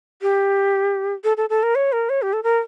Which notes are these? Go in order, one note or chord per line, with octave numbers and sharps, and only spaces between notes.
G4
A4
A4
A4
A#4
C#5
A#4
C#5
G4
A4
A#4